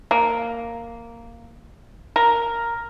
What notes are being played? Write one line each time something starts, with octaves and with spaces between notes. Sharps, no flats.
A#3
A#4